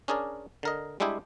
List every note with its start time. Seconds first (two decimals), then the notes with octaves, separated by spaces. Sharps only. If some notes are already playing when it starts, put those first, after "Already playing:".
0.08 C#4 D4 G#4 A#4 D5
0.63 D3 A#4 D#5
1.00 G3 G#3 D4 E4 G4 G#4